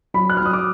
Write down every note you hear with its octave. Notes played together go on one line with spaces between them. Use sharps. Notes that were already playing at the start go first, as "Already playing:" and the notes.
F#3 B5
F#6
F6
F#3 D#6
D6